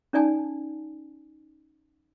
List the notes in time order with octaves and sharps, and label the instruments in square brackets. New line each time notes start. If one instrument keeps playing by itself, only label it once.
[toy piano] C#4 D#4 D5 G#5 A5